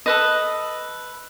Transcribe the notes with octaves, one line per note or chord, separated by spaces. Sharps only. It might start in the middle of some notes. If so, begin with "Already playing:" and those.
A4 B4 D#5